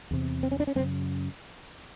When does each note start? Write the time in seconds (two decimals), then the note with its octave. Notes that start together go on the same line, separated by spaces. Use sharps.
0.11 E2 C3
0.43 C4
0.52 C#4
0.60 D4
0.67 C#4
0.75 F#2 C4
0.80 C#3